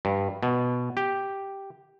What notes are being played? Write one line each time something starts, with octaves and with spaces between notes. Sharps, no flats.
G2
B2
G4